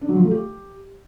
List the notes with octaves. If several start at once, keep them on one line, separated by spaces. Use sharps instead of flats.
D4
F#3
F3
A3
G4